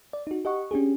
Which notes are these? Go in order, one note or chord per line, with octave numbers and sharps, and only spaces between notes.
D5
D#4 F#4
G4 D#5 F#5 C#6
C#4 D4 G4 G#4